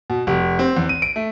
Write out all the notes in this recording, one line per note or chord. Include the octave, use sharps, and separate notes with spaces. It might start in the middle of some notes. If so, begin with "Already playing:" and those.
B2
F1
C4
E2
D#7
D7
A3